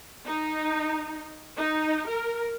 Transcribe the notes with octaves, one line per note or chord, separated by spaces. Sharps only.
D#4
D#4
A#4